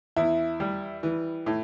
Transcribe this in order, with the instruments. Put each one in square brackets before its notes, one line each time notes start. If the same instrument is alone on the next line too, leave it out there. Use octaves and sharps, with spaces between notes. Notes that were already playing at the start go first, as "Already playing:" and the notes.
[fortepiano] E2 [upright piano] E4
[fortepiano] G3
E3
A2